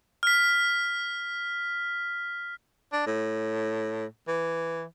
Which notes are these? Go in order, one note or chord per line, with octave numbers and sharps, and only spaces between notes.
F6 B6
D4
A2
E3